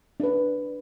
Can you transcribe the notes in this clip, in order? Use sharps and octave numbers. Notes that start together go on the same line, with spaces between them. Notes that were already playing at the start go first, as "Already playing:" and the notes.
D4 B4